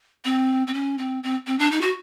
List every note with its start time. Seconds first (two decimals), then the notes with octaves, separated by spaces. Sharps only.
0.25 C4
0.67 C4
0.74 C#4
0.98 C4
1.23 C4
1.47 C4
1.59 D4
1.71 D#4
1.81 F#4